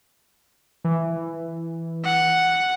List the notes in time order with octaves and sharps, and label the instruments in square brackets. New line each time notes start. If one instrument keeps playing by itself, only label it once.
[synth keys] E3
[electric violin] F#5